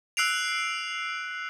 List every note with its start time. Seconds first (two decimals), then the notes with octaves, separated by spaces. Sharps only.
0.17 E6 F#6 C7 D7 F7